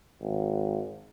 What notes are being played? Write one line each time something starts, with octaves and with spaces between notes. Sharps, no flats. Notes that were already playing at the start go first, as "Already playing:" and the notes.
G#1